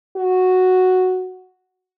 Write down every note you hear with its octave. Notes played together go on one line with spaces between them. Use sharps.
F#4